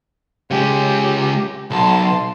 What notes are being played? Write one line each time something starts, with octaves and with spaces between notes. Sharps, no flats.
C#3 G#3 G4
B1 A5 C6